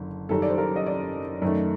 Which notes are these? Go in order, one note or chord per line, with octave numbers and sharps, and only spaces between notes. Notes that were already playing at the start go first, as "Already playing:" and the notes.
Already playing: F#1 D3
F#1 F#2 D#3 G3 A4
D5
C5
A#4
D#5
D5
F#2 D#3 A3